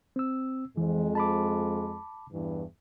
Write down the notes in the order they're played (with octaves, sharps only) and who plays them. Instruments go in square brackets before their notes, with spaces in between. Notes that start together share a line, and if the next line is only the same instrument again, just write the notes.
[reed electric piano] C4 E6
[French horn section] F2 G#3 [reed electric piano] E3
[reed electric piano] A5 B5 D6
[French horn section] E2 G2 E3